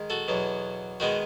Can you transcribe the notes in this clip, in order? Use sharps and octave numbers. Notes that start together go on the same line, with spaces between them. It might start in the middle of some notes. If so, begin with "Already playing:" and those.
Already playing: D#3 G#3
F#4 A4
E2 B2 F#3
D#3 G#3 B3 D#4 F#4